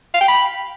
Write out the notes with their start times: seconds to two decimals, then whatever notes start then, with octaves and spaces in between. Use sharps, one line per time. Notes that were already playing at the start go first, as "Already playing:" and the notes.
0.14 F5
0.21 G5
0.28 B5